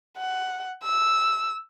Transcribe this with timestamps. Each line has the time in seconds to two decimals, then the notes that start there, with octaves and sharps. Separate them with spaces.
0.17 F#5
0.83 E6